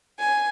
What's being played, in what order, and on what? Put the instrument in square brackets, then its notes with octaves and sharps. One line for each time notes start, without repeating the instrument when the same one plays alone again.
[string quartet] G#5